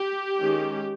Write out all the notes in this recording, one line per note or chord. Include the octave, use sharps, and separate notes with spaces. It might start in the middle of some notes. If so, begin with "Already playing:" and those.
Already playing: G4
D#3 G#3 C#4